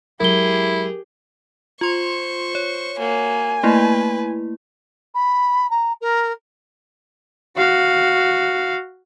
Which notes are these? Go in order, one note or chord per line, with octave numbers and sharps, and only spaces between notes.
F#3 G#3 E4 G4 G#4 A#4 G7
F4 C5 C6 C#6
C#5
A#3 F#4 G#5
A3 A#3 E4 B4
B5
A#5
A#4
F#4 F5